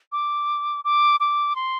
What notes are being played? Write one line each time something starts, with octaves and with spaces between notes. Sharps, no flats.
D6
D6
D6
C6